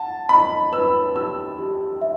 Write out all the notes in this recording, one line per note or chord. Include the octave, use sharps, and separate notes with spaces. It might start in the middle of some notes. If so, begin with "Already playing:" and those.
Already playing: F#5 A5
D#5 B5
B4 E6
G4 E6
G4
E5